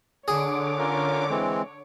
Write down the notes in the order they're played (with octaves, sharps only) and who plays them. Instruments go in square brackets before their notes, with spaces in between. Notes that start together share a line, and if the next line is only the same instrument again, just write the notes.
[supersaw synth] D3 D6 [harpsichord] G#4 [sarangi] C#5
[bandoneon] C#4 F4 A#4
E3 G#3 C4